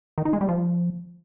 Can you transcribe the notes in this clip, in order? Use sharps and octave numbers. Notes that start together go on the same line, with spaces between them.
D#3
D#4
G#3
G3
F3